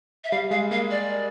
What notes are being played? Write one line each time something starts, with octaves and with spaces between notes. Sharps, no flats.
E5
G3 F5
G#3 F5
A#3 F5
D5